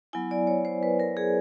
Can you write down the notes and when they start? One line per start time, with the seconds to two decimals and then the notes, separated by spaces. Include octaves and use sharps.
0.13 F#3 B3 E4 G#5
0.31 D5
0.47 C#5
0.65 C5
0.83 B4
1.00 A#4
1.17 G#4